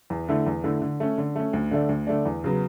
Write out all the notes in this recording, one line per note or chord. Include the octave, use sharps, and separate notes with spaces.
E2
D3 A3 E4
E2
D3 A3 E4
D3
A3 C#4
D3
A3 C#4
D2
D3 A3 D4
D2
D3 A3 D4
E2
C#3 F#3 B3